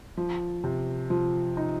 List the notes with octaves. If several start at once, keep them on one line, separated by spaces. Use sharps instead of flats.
F3
C3
F3
D#4